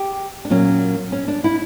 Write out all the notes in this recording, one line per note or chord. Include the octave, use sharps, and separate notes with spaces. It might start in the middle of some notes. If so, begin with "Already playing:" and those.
Already playing: G4
D4
A#2 F#3 A#3 C#4
C#4
D4
E4